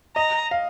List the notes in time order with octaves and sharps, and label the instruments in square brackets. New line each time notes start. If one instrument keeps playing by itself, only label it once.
[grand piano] D#5 [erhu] A#5
[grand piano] F5